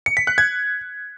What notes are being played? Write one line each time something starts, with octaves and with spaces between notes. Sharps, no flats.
C#7
B6
F#6
G#6